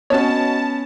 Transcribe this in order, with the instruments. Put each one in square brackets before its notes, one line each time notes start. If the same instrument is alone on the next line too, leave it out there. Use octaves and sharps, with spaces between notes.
[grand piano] B3 C#4 [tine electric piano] F#4 D#5 [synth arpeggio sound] C#5 [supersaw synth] A5